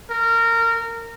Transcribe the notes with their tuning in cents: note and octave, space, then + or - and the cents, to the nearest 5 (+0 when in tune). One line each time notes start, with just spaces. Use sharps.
A#4 -20